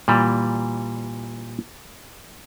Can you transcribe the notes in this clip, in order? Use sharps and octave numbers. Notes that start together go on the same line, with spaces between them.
A#2 E3 G3